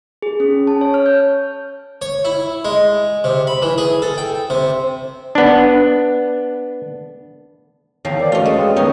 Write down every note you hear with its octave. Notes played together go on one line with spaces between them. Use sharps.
G#4
C#4
A5
C#5
F6
G6
C#5
E4
G#3
C3
B5
E3
G#4
A4
G5
C3
B3 D4
E2 E4 C#5 F5 G5 A5
A#4 C5 D5
A3 C#4 F4 F#4 B4 D#5
G#3 A3
D5 G5 D#6
D#3 F#3 B3 C#4 D#4 A#4